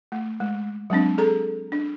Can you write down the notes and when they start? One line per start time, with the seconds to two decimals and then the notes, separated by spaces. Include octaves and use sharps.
0.12 A3
0.40 G#3
0.90 F#3 G#3 C4 D4
1.18 G#4 A4 A#5
1.72 D4